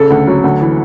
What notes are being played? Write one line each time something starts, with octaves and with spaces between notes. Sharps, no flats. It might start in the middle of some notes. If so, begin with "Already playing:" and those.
Already playing: C#3 A4
D2
F#3
D2
E3